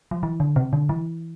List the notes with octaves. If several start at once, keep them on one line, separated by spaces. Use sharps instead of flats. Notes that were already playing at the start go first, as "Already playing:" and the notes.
F3
E3
D3
C3
D3
E3